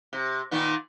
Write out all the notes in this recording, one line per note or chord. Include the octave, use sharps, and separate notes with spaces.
C3
A#2 D#3 B3